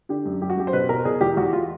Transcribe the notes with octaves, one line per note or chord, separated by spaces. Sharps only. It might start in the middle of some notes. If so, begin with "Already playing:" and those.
D3 G4
F#2
F#2 G4
F#4
F#2 G4
C5
B2 B4
B2 A#4
B2 G#4
E2 G4
E2 F#4
F4